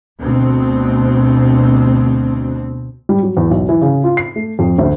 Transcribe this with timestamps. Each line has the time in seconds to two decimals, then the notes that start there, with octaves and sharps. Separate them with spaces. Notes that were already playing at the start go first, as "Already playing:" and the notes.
0.20 D2 B2 C4
3.09 G3
3.22 F#3
3.37 E2
3.51 B1
3.69 E3
3.82 C#3
4.04 F4
4.17 C7
4.36 A3
4.59 F2
4.78 D2